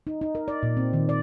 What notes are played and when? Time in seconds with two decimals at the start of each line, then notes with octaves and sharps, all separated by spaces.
0.07 D#4
0.21 D#4
0.35 A#4
0.48 D5
0.63 A#2
0.77 C4
0.93 D#3
1.09 D5